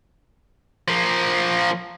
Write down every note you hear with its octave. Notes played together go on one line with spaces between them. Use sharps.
F3 A#3